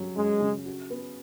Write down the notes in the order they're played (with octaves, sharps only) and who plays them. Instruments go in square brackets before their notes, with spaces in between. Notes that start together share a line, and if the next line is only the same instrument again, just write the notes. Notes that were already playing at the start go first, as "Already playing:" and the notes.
Already playing: [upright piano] C#3 F#3
[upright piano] F#2 [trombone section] G#3
[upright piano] C#3
F#4
B3